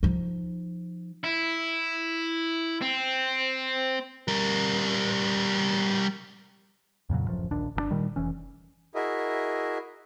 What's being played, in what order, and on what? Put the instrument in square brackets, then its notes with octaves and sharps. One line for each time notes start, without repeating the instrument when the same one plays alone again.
[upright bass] F3 D#4
[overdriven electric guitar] E4
C4
[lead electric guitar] G3 A#4
[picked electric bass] F2 A#2 C#3 F#3
D1 A1 F#2 F3
D1 A#1 D#2 D4
G1 C#3 D4
A#2 D#3 G3
F1 E3 C#4
[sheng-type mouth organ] E4 F#4 G#4 A#4 D#5 E5